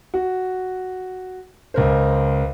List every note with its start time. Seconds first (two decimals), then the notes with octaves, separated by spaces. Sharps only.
0.14 F#4
1.74 C#2 A#4 C5